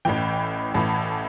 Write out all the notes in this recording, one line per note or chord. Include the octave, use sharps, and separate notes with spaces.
A1 A2 E3 G5
A1 A2 E3 A5